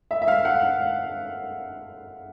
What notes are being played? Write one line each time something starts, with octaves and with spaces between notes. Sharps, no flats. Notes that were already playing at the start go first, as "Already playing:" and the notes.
E5
E5
F5
F#5